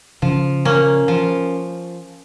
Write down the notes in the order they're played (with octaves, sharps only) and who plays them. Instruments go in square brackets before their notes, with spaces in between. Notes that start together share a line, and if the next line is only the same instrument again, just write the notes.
[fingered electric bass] C#3 [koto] F3
[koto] A#3 C#4
F3